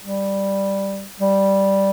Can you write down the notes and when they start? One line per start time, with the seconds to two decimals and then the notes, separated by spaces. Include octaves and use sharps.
0.04 G3
1.20 G3